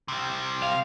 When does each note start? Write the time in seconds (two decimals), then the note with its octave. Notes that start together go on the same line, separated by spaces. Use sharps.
0.08 C3 G3
0.62 F5